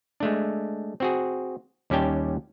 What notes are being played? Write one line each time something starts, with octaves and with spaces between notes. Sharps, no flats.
G#3 A3 D4
C4 F#4 G#4
D#2 G3 C#4 G4 G5 A5